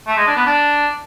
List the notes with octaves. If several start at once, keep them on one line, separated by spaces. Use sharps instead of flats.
A3
G#3
D4
B3
D4